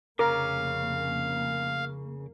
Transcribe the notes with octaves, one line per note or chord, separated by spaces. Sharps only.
F1 C#3 A#3 C#4 A#4 F5 D6